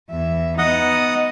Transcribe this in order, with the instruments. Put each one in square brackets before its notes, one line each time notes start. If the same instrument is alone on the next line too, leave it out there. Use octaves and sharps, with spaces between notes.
[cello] E2 E5
[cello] B3 D#4 [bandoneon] D#5 F#5 D#6